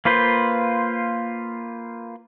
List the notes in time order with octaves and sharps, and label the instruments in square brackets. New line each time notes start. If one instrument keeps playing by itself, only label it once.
[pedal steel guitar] A#3 F4 B4 C5